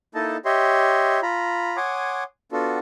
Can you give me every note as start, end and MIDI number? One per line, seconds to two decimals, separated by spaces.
0.15 0.37 58
0.15 0.37 63
0.15 0.37 64
0.15 0.37 69
0.15 0.37 75
0.15 0.37 81
0.45 1.20 67
0.45 1.20 73
0.45 1.20 75
0.45 1.20 76
0.45 1.20 84
1.22 1.77 65
1.22 1.77 82
1.22 1.77 83
1.77 2.24 73
1.77 2.24 78
1.77 2.24 80
1.77 2.24 84
1.77 2.24 86
1.77 2.24 87
2.52 2.79 59
2.52 2.79 62
2.52 2.79 65
2.52 2.79 66
2.52 2.79 69